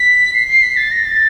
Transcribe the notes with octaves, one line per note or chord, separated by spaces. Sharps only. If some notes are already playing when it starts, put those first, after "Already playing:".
Already playing: B6
C7
C7
B6
A6
A#6
A6